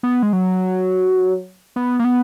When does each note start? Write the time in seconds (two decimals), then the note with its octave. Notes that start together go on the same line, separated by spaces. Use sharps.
0.03 B3
0.23 G#3
0.33 F#3
1.76 B3
1.99 A#3
2.04 B3